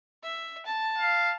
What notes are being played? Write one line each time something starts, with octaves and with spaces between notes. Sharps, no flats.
E5
A5
F5